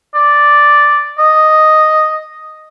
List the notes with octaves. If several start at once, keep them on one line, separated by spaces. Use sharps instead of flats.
D5
D#5